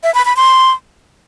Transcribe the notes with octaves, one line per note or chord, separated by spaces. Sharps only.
E5
B5
B5
C6